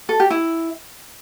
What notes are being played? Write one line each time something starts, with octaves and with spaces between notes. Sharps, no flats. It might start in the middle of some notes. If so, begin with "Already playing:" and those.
A4
G4
E4